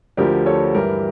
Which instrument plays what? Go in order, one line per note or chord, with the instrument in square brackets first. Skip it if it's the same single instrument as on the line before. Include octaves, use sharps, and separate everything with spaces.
[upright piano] D2 D3 F3 G4 A#4
A4 C#5
G2 E3 G4 A#4